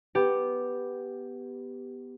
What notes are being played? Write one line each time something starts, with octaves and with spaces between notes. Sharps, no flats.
B3 G4